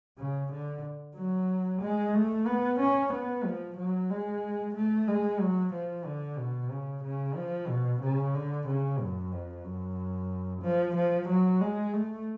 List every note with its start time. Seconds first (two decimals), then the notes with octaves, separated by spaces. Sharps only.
0.19 C#3
0.52 D3
1.17 F#3
1.82 G#3
2.15 A3
2.47 B3
2.79 C#4
3.13 B3
3.45 F3
3.78 F#3
4.10 G#3
4.75 A3
5.08 G#3
5.40 F#3
5.73 F3
6.05 D3
6.38 B2
6.71 C#3
7.04 C#3
7.36 F3
7.68 B2
8.02 C#3
8.35 D3
8.67 C#3
9.00 F#2
9.32 F2
9.65 F#2
10.62 F3
10.96 F3
11.28 F#3
11.61 G#3
11.94 A3